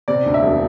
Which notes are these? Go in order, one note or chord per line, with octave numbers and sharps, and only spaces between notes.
C3 D5
D2
E5
E1